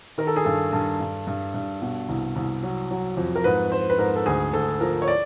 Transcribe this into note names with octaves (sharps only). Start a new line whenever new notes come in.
D#3 A#4
A4
G#4
G2 A4
G2
G2
G2
G2
B2
C2
C2
F#3
F#3
F2
A#4
G#2 B4
G#2 C5
B4
G#2 A#4
A4
D2 G#4
D2 A4
F3 A#4
C#5
D5